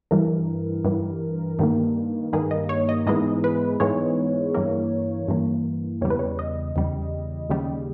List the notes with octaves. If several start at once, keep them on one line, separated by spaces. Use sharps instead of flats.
G2 E3 G3 A#4
G2 E3 G3
G2 D#3 G3 A#3
G2 D#3 G3 A#3 G#4
D#5
C#5
D#5
G#2 E3 G#3 B3 D#5
B4
G#2 E3 G#3 B3 C#5
G2 E3 A#3
G2 E3 A#3
E2 C#3 G3 C#5
B4
C#5
D#5
E2 C#3 G3
D#2 C#3 G3